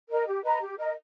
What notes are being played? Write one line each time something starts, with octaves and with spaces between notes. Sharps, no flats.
A#4 D#5
G4
B4 D#5 A#5
G4
A#4 D#5